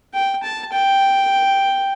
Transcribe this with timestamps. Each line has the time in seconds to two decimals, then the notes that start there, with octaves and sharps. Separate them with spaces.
0.14 G5
0.43 A5
0.73 G5